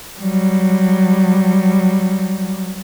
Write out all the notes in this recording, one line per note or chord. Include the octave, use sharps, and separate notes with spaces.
F#3 G3